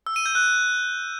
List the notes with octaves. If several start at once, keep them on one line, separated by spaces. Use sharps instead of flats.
E6
D#7
G6
F#6